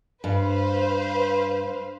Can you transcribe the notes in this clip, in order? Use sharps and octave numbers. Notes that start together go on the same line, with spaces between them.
G2 B4 C5 F5